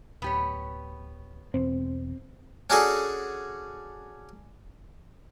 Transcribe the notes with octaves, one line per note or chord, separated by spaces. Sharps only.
D1 B3 G4 C#5
E1 E2 B2 C4
C#4 D4 F#4 G#4 A4